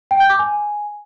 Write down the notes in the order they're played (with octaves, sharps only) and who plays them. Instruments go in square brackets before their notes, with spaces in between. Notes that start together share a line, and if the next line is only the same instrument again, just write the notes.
[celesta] G5
G6
D6
G#5